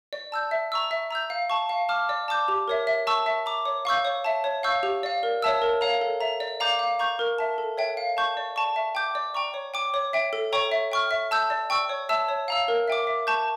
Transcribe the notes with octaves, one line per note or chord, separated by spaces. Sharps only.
D5
A5 E6 G6
E5
A#5 C#6 E6
E5
A#5 E6 G6
F5
A5 C#6
F5
A5 D6 F6
D5
A5 D6 G6
G4
A#4 C#5 E5
E5
A5 C#6 E6
E5
A#5 D6
C#5
F5 C#6 E6 G6
C#5
E5 A5
C#5
F5 C#6 E6 G6
G4
D5 F5
A#4
C#5 E5 A5 E6
A#4
C#5 F5 A#5
A4
E5 A#5
D5
F5 A#5 D6 G6
F5
A#5 C#6 G6
A#4
E5 A5
A4
C#5 E5 G5
F5
A5 C#6 G6
D5
A5 C#6
E5
G5 D6 G6
D5
G5 A#5 C#6
C#5
G5 D6
C#5
E5 G5
A4
C#5 G5 A#5 C#6
E5
G5 C#6 F6
E5
A5 E6 G6
D5
G5 C#6 E6
C#5
E5 A5 E6
C#5
F5 A#5 E6
A#4
E5 G5 D6
E5
A5 C#6 G6